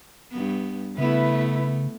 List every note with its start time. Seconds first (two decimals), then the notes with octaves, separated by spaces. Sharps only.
0.30 G2 B3
0.98 C#3 A3 B3 E4 B4 E5